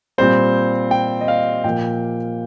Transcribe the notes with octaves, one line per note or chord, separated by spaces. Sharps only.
A#2 G3 C4 C5
G5
D#5
F5
A#2 F3 A#3 G5